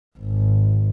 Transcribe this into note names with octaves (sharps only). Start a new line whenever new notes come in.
G#1